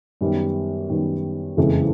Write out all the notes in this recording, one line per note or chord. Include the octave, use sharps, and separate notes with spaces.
F#2 D#3 G3 B3
F#2 D#3 G3 B3
F#1 F2 C#3 E3 G#3